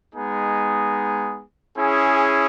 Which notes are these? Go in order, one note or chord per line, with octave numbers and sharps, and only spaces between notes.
G#3 B3 D#4 G#4
C#4 E4 G#4